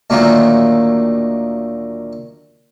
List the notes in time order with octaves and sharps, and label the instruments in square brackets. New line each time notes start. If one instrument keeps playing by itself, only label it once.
[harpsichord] D2 A#2 D#3 F#3 A3 A#3